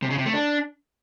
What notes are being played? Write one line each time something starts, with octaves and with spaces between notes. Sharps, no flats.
C3
C#3
C3
A3
D4